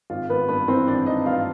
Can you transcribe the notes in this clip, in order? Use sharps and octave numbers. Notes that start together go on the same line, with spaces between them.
G#1 F4
G#1 B3 B4
G2 B3 B4
E3 C4 C5
G#1 D4 D5
G#1 D#4 D#5
G2 F4 F5